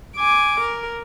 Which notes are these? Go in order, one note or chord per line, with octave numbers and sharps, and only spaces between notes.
G#5 D6
A#4